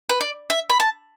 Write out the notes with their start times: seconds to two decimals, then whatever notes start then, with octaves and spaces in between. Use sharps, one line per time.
0.09 B4
0.21 D5
0.50 E5
0.70 B5
0.80 A5